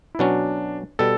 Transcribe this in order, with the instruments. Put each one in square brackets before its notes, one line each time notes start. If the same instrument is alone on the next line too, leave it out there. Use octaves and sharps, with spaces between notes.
[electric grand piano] E4
[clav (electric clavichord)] B2 F#3 C#4 [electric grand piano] D4
[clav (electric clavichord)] B2 G3 [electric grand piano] A4